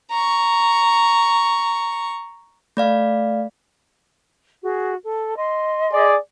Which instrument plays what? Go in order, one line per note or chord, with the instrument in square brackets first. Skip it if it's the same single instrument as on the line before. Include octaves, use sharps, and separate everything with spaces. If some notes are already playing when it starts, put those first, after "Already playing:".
[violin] A#5 C#6
[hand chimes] A3 D5 F5
[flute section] F#4 G#4
A4
D#5 C6
[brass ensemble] G#4 D5